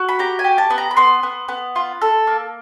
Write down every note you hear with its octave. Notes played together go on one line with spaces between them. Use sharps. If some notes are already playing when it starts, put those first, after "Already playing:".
Already playing: F#4
B5
G4 A#5
G#5
G4
A5
B3
A#5
B5
B3 C6
B3
B3
F4
A4
A#3